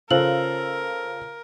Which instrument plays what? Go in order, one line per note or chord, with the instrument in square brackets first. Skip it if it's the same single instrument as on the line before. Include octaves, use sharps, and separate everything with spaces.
[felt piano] C#3 F4 A4 [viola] A#4 [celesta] C5 F#7